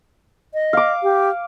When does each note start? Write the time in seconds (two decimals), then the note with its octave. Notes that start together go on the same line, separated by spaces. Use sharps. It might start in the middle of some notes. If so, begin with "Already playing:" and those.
0.54 D#5
0.73 F5 D6
1.03 G4